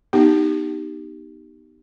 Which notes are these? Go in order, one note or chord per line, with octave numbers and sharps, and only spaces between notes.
B3 D#4 G4